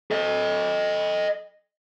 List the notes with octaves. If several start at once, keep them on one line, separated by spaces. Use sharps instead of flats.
A4 D#5